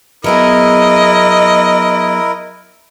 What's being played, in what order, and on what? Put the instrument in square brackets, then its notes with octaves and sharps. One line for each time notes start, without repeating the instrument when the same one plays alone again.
[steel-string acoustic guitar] F#3 B3 G#4 [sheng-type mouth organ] E4 A#4 [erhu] D#5